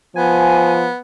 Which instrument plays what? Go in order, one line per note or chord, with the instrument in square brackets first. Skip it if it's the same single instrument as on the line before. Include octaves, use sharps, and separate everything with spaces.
[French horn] F3 [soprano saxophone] B3 [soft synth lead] G#5